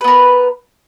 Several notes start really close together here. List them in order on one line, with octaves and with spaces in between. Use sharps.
B4 B3 A#4